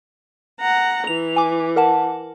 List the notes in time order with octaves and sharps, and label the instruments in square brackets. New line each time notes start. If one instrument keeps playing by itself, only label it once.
[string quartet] F#5 A#5
[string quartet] E3 [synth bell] F7
[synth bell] G#5 D6
A#4 F#5 A5